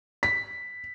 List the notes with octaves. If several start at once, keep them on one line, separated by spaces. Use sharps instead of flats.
B6